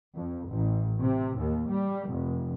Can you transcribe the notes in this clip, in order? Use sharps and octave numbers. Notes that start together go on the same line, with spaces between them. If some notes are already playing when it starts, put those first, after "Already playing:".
F2
A1
C3
D#2
G3
F1